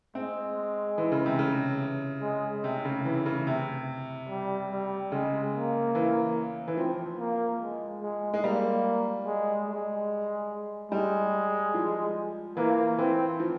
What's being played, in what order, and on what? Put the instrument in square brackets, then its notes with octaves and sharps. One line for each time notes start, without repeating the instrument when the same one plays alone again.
[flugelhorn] G#3 [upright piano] C4
[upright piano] E3
C#3
C3
C#3
[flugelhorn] G#3
[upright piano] C3
C#3
E3
C#3
C3
[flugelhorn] G3
G3
[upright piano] C#3 [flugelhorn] G#3
[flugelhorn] A#3
[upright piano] E3
E3
[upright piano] F3 [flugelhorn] C4
[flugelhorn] A#3
G#3
G#3
[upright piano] G#3
[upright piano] G3 [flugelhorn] A#3
[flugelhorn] G#3
G#3
[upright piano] G3 [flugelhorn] G#3
[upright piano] F3
[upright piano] E3 [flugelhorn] A#3
[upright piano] E3 [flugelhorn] C4
[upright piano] F3